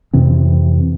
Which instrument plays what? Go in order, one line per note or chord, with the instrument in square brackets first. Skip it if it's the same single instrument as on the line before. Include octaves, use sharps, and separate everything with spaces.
[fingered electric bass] F2 C3 E3 C4